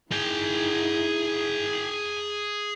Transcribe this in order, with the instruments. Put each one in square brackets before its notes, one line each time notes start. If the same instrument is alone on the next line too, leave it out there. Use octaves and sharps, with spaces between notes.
[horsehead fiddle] D#4 E4 [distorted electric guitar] G#4 G5